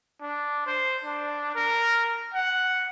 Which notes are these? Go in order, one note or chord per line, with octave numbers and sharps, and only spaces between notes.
D4
C5
D4
A#4
F#5